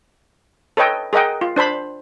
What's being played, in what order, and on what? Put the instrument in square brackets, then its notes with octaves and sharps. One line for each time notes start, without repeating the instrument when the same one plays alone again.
[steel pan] A4 B4 C#5 D#5 G5
G#4 A#4 D#5 F#5 G5
F4
D4 C5 A5 B5